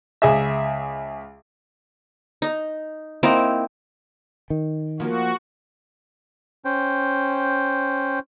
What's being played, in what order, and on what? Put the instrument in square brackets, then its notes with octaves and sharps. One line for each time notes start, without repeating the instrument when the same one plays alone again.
[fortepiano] C#2 G#4 E5
[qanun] D#4
A#3 C4 D#4 E4
[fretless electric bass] D#3
[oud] F3 A#3 [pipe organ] F#4
[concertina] C#4 C5 G5